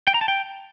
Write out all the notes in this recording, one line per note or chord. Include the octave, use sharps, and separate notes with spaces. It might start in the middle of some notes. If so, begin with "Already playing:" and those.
G5
A#5
A5
G5